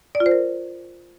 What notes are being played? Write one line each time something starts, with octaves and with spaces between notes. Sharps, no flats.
D5
F4
C5
A#4